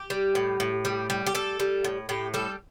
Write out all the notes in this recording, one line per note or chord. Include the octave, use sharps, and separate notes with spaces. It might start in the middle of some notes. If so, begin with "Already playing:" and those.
Already playing: G4
G3
A2
A2
G3
G3
G4
G3 A4
G3
A2
A2 G4
G3 A4